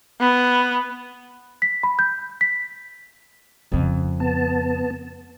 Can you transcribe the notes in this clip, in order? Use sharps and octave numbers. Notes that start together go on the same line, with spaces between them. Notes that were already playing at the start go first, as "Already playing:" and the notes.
B3
B6
B5
G6
B6
F2 C#3
B3 A5